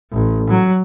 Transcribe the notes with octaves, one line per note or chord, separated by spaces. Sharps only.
A1
F#3